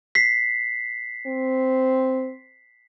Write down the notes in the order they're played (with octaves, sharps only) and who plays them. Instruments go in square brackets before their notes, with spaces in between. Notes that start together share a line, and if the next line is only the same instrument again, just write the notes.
[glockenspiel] B6 C7
[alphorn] C4